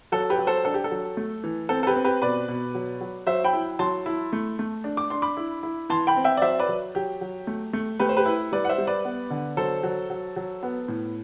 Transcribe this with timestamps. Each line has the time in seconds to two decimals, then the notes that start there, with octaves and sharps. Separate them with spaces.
0.12 F#3 A4
0.30 G4 B4
0.38 F#3
0.47 A4 C5
0.65 D4 A4
0.74 G4
0.84 A4
0.91 F#3
1.17 A3
1.44 E3
1.69 C4 A4
1.83 A4
1.87 G4 B4
1.96 C4
2.04 G4 B4
2.22 B2 B4 D5
2.48 B2
2.75 F#3
3.01 F#3
3.27 F#3 C5 E5
3.44 G5 B5
3.53 E4
3.79 F#3 A5 C6
4.06 E4
4.33 A3
4.59 A3
4.84 D4
4.97 D6
5.10 D4 C6
5.22 B5 D6
5.37 E4
5.63 E4
5.90 E3 A5 C6
6.07 G5 B5
6.16 C4
6.24 E5 G5
6.37 D5
6.42 F#3 C5 E5
6.59 B4 D5
6.69 F#3
6.95 F#3 G4
7.21 F#3
7.47 A3
7.73 A3
8.00 A3 G4 B4
8.09 C5
8.17 G4 B4
8.26 E4
8.52 G3 B4 D5
8.65 F#5
8.69 C5 E5
8.78 G3
8.87 B4 D5
9.05 B3
9.30 D3
9.57 F#3 A4 C5
9.83 F#3
10.10 F#3
10.36 F#3
10.63 B3
10.88 A2